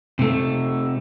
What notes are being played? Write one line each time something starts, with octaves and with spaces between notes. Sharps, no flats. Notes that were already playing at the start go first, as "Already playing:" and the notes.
C3 A3